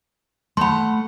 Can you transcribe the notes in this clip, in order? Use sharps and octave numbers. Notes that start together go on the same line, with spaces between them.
A3 F#5 B5 C6